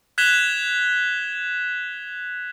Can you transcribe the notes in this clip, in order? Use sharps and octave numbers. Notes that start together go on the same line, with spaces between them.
F#6 G#6 B6 E7 F7 G7